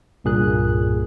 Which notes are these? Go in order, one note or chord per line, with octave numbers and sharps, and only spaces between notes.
C2 G2 A#2 G#4 A#4 F#6